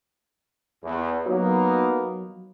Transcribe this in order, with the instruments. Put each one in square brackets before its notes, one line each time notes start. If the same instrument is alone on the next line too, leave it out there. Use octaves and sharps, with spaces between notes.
[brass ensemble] E2
[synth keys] F#3 [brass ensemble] A#3 B3 D#4